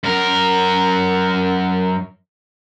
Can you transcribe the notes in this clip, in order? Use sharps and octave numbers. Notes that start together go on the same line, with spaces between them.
F#2 A#4